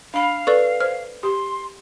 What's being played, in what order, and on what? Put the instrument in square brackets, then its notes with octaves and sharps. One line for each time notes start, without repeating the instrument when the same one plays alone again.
[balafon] D4 B5 [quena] F5
[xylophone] A4 B4 D5 [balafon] C#6
[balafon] C5 [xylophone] F6
[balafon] G4 [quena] C6